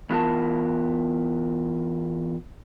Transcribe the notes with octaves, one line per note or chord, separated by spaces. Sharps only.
E2 B3 F4 A#4 A5